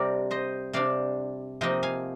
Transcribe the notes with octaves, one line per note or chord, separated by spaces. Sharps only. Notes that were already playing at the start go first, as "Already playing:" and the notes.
Already playing: C3 G3 D4 A#4 D5
C5 D#5
C3 G3 D4 D5 F5
C3 F3 A#3 D#4 D#5 G5
F5 G#5